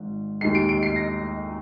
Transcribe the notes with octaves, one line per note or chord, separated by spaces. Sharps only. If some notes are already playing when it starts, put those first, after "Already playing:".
Already playing: G#1 G#2
D#2 D#3 G#3 C7
D7
D7
C7
A#6